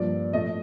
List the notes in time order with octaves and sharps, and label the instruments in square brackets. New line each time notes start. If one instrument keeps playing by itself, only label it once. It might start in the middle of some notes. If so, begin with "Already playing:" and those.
Already playing: [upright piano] G2 F3 A#3 D5
A2 F3 A3 D#5